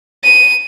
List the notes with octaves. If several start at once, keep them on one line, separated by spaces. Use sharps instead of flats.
D#7